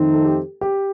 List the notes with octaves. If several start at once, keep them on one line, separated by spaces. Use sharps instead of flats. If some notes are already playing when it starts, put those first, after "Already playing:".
Already playing: F2 D#3 A3 C4 D#4
A4
G4
G4